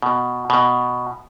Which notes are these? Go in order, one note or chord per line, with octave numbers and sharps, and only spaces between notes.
B2
B2